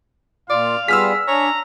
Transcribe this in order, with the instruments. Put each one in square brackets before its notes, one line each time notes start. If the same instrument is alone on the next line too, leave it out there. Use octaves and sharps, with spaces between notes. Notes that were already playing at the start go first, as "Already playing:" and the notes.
[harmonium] A#2 F4 [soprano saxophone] D5 [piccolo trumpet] F5
[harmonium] G3 B3 F4 [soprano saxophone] G#4 [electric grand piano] E6 F6 B6
[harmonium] D4 G#5 [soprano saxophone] C#5 [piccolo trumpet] A#5